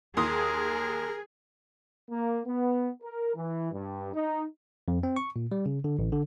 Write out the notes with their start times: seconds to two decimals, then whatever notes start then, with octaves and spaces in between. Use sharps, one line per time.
0.17 D#2 G#4 A#4 C6 D#6
2.09 A#3
2.46 B3
3.02 A#4
3.34 E3
3.72 G2
4.13 D#4
4.88 F2
5.03 C4
5.16 C#6
5.36 A#2
5.52 G3
5.66 C#3
5.84 D3
5.99 A1
6.12 D3